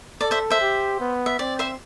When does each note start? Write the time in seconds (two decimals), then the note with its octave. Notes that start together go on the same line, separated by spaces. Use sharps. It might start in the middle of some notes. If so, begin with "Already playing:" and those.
0.21 A4 D5
0.31 C5 E5
0.50 C5 E5
0.61 G4
1.00 B3
1.26 E5
1.39 C4 D5
1.59 C5 E5